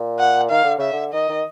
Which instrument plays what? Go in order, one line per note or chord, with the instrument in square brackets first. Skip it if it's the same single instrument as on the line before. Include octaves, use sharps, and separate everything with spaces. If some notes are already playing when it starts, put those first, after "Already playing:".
Already playing: [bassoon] A#2
[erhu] F#5
[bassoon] D#3 [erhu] F5
[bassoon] D3
[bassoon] C#3 [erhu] E5
[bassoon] D3
[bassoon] D#3 [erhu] D#5
[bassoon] D#3